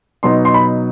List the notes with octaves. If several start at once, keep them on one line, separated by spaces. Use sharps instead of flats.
B2 F#3 B3 D#4 C6
C6
B5